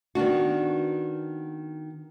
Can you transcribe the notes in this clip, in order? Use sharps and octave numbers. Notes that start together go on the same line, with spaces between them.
D#3 B3 D4 F#4